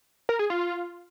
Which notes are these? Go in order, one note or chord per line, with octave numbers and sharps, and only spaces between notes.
A#4
G#4
F4